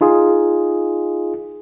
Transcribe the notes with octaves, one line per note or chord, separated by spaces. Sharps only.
D#4 F4 G#4